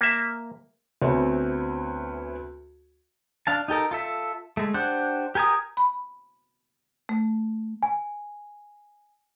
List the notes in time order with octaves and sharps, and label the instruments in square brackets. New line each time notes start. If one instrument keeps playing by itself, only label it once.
[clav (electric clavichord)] A#3 E5
[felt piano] D2 B3 C4 C#5 E5 G#5
[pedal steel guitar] D4 F5 A5
D#4 G4 A4 A#4
F4 A4 E5
G#3 A3
D4 G4 C5 F#5
G4 A#4 G#5 A#5 D#6
[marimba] B5
A3
[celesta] G#5